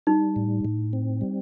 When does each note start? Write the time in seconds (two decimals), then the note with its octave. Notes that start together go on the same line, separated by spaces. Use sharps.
0.07 G3 D#4
0.36 A2
0.65 A2
0.93 C4
1.21 G3